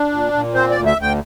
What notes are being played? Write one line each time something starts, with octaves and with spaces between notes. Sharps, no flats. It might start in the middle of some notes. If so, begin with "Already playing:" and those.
Already playing: D4
A#2
A#2
C4 C5
D2 D5
E5
D2 G5